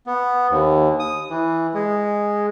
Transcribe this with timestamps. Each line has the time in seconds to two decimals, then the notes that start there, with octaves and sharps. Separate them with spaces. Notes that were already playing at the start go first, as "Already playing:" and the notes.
0.07 B3
0.50 D#2
0.99 D#6
1.30 E3
1.74 G#3